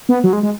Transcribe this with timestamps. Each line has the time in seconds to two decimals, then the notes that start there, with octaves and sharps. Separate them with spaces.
0.09 B3
0.24 F#3
0.33 G#3
0.43 G#3